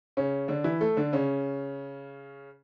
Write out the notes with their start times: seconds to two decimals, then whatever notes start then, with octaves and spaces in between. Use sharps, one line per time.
0.17 C#3 C#4
0.48 D3 D4
0.64 E3 E4
0.81 A3 A4
0.97 D3 D4
1.13 C#3 C#4